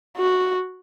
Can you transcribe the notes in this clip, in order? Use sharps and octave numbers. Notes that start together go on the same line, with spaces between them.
F#4